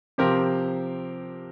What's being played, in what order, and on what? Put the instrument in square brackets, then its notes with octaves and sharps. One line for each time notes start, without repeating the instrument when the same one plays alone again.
[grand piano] C3 F3 C4 G4 A#4